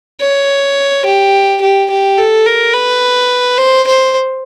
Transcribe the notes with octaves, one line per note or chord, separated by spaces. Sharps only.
C#5
G4
G4
G4
A4
A#4
B4
C5
C5